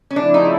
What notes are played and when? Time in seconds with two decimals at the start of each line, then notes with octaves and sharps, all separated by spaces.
0.11 C#4
0.16 C#3 F3 A3 C4 D4 E4
0.34 D#4